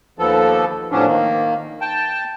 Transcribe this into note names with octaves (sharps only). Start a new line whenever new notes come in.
D#2 F3 B3 A4
A2 C3 F3 B3 C#4 D4
D#3 A#3
G5 A5